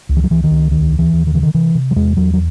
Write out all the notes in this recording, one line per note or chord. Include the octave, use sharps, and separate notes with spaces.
C#2
E3
F#3
C#2 E3
D#3
C#2
D#2 D#3
D#2
E3
D#2
D#3
C#3 E3
D#3
C3 E3
C3
F#3
E2 G#3
E2 F#3
F#3